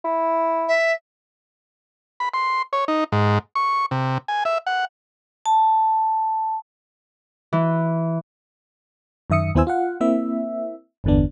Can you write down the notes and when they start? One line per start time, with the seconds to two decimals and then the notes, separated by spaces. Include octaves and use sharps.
0.05 E4
0.68 E5
2.20 B5
2.34 C6
2.73 C#5
2.88 D#4
3.12 G#2
3.56 C#6
3.91 C3
4.28 G#5
4.45 E5
4.67 F#5
5.46 A5
7.53 E3
9.30 F#2 D#3 E5 D#6 C#7
9.55 D#2 B3 E4 C5 G#5 E6
9.67 F4 F5 F#5
10.01 A#3 C4 E4 E5
11.04 G1 E2 D3 B3 D4